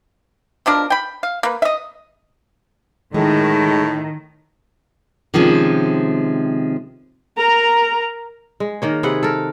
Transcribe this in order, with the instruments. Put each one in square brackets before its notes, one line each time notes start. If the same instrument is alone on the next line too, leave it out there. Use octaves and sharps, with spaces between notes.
[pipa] B2 F3 D4 A#4
G5 B5
F5
A#3 B4
D#5 E5
[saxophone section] A2 [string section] D#3 [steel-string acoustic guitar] G#3
[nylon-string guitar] C3 D#3 F3 G#3 C4 C#4
[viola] A#4 A#5
[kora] G#3
D#3 A#3 C#5
C3 G#4 B4 F#5
A4 A#4